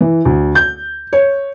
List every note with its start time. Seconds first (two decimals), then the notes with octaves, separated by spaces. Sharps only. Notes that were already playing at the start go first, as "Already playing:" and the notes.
0.01 E3
0.25 D2
0.55 G6
1.13 C#5